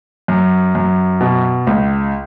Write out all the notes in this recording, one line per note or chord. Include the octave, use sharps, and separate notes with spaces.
F#2
F#2
B2
C#2